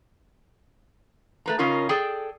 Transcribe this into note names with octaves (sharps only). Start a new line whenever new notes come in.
A3 B4 A#5
C#3 C#4 D#4 F4 A#4
G#4 A4 D5 G5